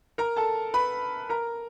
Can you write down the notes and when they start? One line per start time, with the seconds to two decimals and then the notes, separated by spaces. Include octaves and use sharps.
0.18 A#4 A#5
0.36 A4 A5
0.74 B4 B5
1.29 A#4 A#5